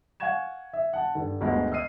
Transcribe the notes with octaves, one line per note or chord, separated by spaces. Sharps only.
F5 F#5 G#5 C#6 G#6 E7
E5
F#5 A5
G2 D3
G1 D2 G#3
D#5 E6 F6 C7 D#7